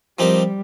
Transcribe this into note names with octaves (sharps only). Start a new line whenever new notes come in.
F3 G3 C4 D#4 G4 A#4